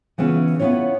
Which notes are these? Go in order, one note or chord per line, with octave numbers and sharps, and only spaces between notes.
C#3 E3 B3 C#4 F4
B3 C#4 D4 E4 F4 C#5